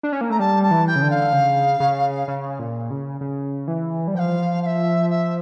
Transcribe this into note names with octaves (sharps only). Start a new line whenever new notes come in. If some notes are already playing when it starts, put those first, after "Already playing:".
D4
C#4
A#3
A3 A#5
G3 A5
A5
E3
G5
C#3
D3
F5
C#3
C#3
C#3
A#2
C#3
C#3
E3
G3
F3 F5 G5
F5
E5
E5